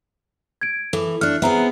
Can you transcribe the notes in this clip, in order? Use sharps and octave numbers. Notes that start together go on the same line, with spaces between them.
G#6 D7
E3 A4
A3 D4 F6 F#6
B3 C4 G#4 E5 A#5